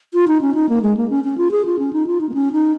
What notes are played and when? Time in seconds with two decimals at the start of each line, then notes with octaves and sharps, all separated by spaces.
0.14 F4
0.28 D#4
0.41 C#4
0.55 D#4
0.69 A#3
0.82 G#3
0.97 A#3
1.10 C#4
1.24 C#4
1.38 F4
1.51 G#4
1.65 F4
1.79 C#4
1.93 D#4
2.07 F4
2.21 D#4
2.29 A#3
2.34 C#4
2.53 D#4